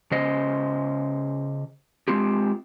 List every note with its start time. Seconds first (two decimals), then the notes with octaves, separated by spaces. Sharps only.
0.11 C#3 C#4 C5 D#5
2.08 G#3 C4 F4 G4